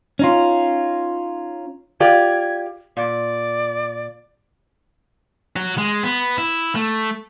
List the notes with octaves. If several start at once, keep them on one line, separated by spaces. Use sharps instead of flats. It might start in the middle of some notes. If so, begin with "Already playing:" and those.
C#4 D#4 F4
F4 G4 D5 G#6
A#2 D5
F#4 C#5
G#3
B3
E4
A3